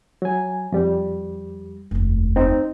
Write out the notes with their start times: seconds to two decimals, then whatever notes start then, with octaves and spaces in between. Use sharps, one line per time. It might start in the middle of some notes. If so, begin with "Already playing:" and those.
0.22 F#3 G#5
0.72 F2 G3
1.91 F1 D#2
2.36 C4 D#4